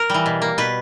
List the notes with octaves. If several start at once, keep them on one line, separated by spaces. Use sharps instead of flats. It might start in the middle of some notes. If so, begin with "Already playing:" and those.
Already playing: A#4
E3 G3
B2
A#3
B2 B4